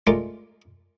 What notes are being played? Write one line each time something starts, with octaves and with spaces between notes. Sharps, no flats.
G#3 A3 F4 A#4 D5